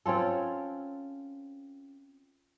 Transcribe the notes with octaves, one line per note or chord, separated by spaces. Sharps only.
C4 C#4 F4 A4